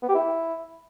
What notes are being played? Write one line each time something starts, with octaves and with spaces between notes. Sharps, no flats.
B3
G4
E4